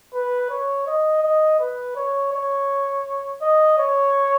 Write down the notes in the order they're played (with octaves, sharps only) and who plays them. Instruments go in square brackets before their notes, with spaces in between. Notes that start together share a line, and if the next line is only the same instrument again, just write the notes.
[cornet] B4
C#5
D#5
D#5
B4
C#5
C#5
D#5
C#5